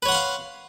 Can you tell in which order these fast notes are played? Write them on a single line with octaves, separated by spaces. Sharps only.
B4 C#5 F#5 C6 F5